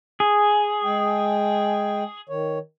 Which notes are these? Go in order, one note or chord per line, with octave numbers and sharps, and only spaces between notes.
G#4
G#3 G5
D#3 C#5